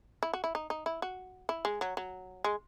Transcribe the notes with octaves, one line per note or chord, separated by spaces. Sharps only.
E4
F#4
E4
D#4
D#4
E4
F#4
E4
G#3
F#3
F#3
G#3